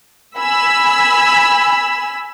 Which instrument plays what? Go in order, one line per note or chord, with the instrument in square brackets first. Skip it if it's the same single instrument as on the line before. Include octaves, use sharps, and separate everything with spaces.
[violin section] G#5 B5 E6